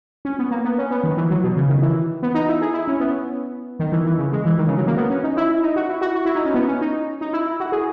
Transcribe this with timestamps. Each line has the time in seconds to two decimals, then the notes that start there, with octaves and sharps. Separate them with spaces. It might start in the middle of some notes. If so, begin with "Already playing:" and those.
0.25 C#4
0.39 B3
0.51 A#3
0.65 B3
0.78 C#4
0.91 B3
1.03 D#3
1.17 E3
1.30 F#3
1.44 B2
1.56 C#3
1.69 D#3
1.82 E3
2.23 B3
2.34 D#4
2.49 E4
2.62 G#4
2.74 E4
2.87 C#4
3.00 B3
3.79 D#3
3.92 E3
4.06 E3
4.18 C#3
4.32 G#3
4.45 E3
4.58 D#3
4.67 C#3
4.77 F#3
4.87 A#3
4.97 B3
5.10 C#4
5.24 D#4
5.37 E4
5.63 D#4
5.76 F#4
5.89 E4
6.02 F#4
6.15 F#4
6.26 E4
6.35 D#4
6.45 C#4
6.54 B3
6.68 C#4
6.81 D#4
7.21 D#4
7.33 E4
7.46 E4
7.60 F#4
7.72 G#4